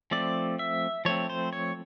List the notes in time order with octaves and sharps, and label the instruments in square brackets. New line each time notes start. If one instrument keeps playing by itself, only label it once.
[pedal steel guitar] F3 A3 C4 D5
E5
F3 A3 C4 C#5
C5
C#5